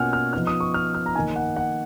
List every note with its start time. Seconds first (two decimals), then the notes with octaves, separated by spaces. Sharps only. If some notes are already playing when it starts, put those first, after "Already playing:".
Already playing: B2 A#3 C#4 F4 F#5 G#5 F6
0.13 F6
0.33 F3 B3 D#4 F6
0.47 D#6
0.60 C#6
0.74 F6
0.95 F6
1.06 A#5
1.15 D#3 A#3 D#4 G#5
1.36 F#5
1.56 F#5